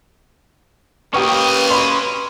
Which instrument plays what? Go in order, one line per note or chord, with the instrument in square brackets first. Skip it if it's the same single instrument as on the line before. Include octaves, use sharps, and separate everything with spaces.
[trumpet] A#3 [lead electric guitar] C#4 D#5 [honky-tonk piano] G4 G5 C#6 [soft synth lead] B4
[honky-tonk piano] B5 C6